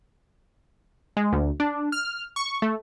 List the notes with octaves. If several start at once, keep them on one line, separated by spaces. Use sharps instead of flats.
G#3
D2
D4
F6
C#6
A3